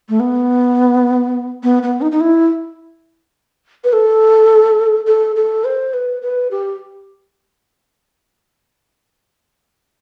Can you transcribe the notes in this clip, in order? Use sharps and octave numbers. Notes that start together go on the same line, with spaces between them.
A3
B3
B3
B3
D#4
D#4
E4
B4
A4
A4
A4
C5
B4
B4
G4